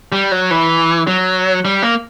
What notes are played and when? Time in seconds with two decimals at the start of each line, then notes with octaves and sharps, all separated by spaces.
0.12 G3
0.32 F#3
0.51 E3
1.07 F#3
1.65 G3
1.83 A#3